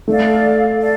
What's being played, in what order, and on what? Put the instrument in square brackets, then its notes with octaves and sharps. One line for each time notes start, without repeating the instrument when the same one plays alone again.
[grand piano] A3 [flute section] A4 D5 F5
[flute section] A4 D5 F5